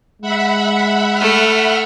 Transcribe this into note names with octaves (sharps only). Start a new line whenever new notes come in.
G#3 E5 F#5 B5
A3 F6